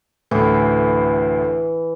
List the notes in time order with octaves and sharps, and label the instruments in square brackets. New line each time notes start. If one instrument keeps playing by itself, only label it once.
[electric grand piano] D2 A2 [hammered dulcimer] E3